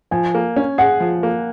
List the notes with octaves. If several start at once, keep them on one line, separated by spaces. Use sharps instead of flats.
F3 G#5
A#3
C#4
G#4 F#5
F3
A#3